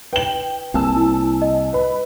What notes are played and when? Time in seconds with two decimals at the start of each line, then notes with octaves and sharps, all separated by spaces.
0.13 B4 G5 F#7
0.74 C2 C3 A#3 G#5 A5 E6
0.96 E4
1.42 D#5
1.73 B4 B5